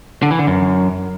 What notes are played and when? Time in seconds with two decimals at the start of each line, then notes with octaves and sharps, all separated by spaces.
0.23 D3
0.31 E3
0.39 D3
0.47 F#2